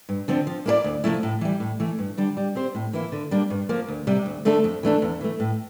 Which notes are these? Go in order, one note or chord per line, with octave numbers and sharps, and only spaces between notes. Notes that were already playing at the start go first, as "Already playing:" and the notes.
G2
D3 F3 C4
F3
A#3 E4 A#4 D5
D2
C3 F3 A3 E4
A2
E3 G3
A2
E3 A3
G2
D3 G3 D4
G3
C4 G4 C5
A2
E3 A#3 E4
D3
G3 A#3 D4
G2
F3 A#3
D2
C3 G3
D2
D3 A3 D4 A4
F2
E3 A3 D4 A4
E2
E3 A3
A2